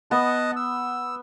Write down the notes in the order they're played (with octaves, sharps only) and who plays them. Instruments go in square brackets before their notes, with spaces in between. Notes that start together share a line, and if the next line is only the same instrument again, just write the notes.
[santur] B3 [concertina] D#5 F#5 A5
[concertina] E6